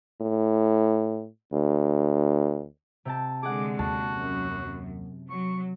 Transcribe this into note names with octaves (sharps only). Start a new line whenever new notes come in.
A2
D2
C3 G5 A5
D3 G#3 G#4 F#5 D6
D#2 F#4 A5
F#2
F#3 C#6